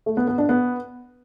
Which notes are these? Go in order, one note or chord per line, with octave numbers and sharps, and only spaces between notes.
A3
B3
B3
D4
B3